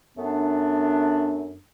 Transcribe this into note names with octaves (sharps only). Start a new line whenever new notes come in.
F#2 A3 B3 D4